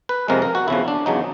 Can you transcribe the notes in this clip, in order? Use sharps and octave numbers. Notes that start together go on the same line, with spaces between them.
B4
F2 C3 F3 G#3 A#4
A#4
F#4
E2 C#3 F3 E4
D4
E2 C#3 F#3 D#4